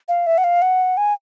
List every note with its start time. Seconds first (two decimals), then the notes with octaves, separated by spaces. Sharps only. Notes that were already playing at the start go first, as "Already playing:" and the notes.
0.08 F5
0.26 E5
0.38 F#5
0.44 F5
0.62 F#5
0.97 G#5